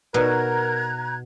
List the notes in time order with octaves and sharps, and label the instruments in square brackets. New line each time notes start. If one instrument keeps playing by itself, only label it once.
[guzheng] B2 [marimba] D#4 B4 D5 [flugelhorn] A#4 [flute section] A#5 F#6 G#6